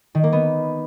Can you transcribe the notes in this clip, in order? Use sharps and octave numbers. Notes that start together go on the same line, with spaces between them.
D#3
A#3
B3